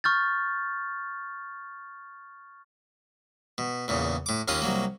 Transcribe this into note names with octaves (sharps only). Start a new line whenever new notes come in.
C#6 F6 G6 A6
B2
E2 A#2 C#3
A2 D6
D#2 A#3 C#4 F4 D#6
C2 F#3 A#3